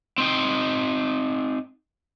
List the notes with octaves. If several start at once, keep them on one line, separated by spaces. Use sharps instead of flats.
C4 D#4 G5